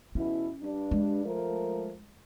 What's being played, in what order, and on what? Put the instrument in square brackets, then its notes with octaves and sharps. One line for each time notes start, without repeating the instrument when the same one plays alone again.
[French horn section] E2 B2 E4 [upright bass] C#4
[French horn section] G2 D4
[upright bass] G#3
[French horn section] F3 A3 A#4